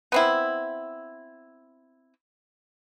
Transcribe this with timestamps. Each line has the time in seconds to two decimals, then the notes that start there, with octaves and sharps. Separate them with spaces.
0.12 B3 C4 E4